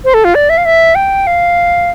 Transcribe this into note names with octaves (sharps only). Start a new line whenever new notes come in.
C5
A4
F4
D5
E5
F5
E5
G5
F5